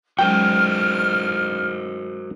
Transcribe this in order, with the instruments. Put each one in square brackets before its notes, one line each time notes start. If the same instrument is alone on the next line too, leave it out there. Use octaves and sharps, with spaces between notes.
[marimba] F#3 G#3 C#4 [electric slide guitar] F#4 A#4 C5 [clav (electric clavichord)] G5 [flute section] F6